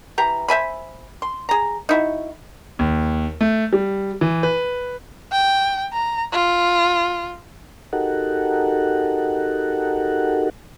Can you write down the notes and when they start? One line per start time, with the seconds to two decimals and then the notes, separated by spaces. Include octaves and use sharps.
0.18 E3 G4 A#5
0.48 C5 E5 G#5 B5
1.22 C6
1.49 G#4 A#5
1.89 D#4 E4 F#4
2.79 D#2
3.41 A3
3.73 G3
4.21 E3
4.43 B4
5.32 G5
5.93 A#5
6.32 F4
7.93 D#4 F#4 G4 A4 A#4 F#5